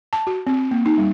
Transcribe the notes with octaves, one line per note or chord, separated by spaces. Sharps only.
A5
F#4
C4
A#3
D#4
G3